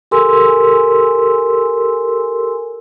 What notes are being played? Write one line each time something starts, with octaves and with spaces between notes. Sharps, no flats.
G4 A4 A#4 G#5 C6 E6